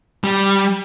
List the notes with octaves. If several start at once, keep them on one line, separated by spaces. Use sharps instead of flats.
G3